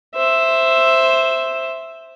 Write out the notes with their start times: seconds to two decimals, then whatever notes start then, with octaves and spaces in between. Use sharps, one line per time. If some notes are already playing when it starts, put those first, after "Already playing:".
0.15 C5 E5